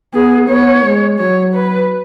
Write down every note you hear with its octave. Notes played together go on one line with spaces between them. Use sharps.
B3 G#4
B3 C#5
G#3
F#3 C#5
B4